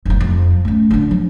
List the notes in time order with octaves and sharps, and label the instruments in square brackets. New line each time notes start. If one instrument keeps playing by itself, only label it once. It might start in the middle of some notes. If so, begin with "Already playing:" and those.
[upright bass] F1 F2
F2
A3 C#4
D3 D4
F3